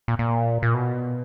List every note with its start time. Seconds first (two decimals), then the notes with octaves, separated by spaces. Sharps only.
0.08 A#2
0.19 A#2
0.62 A#2
0.74 B2